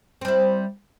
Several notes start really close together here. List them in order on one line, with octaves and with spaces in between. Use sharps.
C4 G3 E4